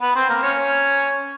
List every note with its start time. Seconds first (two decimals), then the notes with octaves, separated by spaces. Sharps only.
0.01 B3 B4
0.15 C4 C5
0.29 A#3 A#4
0.43 C#4 C#5